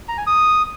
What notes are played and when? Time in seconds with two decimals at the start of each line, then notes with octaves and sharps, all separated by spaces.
0.09 A#5
0.18 G#5
0.27 D#6